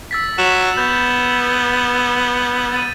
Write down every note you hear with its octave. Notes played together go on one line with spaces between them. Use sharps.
E6 A6 B6
F#3 E7 F7
B3 G6 A6
A6 D#7